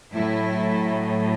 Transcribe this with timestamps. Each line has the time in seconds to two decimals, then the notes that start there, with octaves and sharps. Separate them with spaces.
0.12 A2 F#3 E4